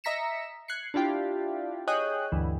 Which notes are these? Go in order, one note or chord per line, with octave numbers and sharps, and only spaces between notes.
D#5 E5 A#5 B6 C#7 E7
F#6 G#6 C7 C#7
D4 E4 F4 G4
G#4 C#5 D#5 G5 D#6 F#6
D2 G2 E3